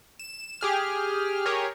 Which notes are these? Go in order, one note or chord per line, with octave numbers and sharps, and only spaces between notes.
E7
G4 G#4 F6
G4 G#4 A#4 C#5